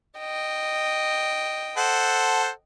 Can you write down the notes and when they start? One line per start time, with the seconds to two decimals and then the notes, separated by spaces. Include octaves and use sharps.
0.19 D#5 G5
1.77 A4 C5 F#5